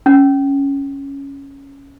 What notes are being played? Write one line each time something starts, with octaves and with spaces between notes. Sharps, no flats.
C#4